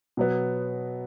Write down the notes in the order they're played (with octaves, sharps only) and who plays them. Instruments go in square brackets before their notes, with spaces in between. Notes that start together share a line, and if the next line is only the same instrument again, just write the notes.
[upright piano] B2 F#3 B3